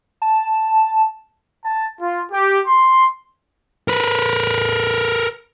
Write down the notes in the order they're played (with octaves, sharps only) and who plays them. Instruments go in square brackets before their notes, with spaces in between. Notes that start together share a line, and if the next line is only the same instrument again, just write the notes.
[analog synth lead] A5
[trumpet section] A5
F4
G4
C6
[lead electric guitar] A#4 B4